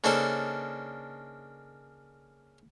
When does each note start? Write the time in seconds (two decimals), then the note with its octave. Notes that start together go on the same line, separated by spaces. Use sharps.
0.04 C#3 A#3 D4 D#4 A4 C5